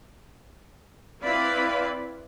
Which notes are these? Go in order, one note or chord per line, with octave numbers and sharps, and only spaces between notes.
C4 E4 B4 D5 F5 B5